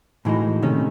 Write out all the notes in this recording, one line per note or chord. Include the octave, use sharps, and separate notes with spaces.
A2 E3 G#3 D#4 F#4
C3 D#3 A3 C#4